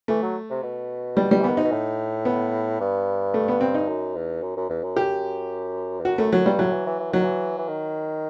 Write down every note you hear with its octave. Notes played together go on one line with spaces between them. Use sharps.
E3 A3
F#3
C3
B2
G3
G3
E3
D#3 B3
C3 D#4
B2
A2
B3
G2
A3
B3
C4
D#4
F#2
E2
F#2
F#2
E2
F#2
G4
E2
F#2 F#4
F#2 A3
F#2 F#3
G2 G3
A2 F#3
E3
E3
E3
D#3 F#3
E3
E3
D#3